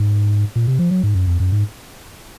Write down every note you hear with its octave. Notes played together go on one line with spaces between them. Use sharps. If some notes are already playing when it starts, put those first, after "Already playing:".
Already playing: G#2
A#2
C3
F3
F#3
G#2
F#2
F2
F#2
G#2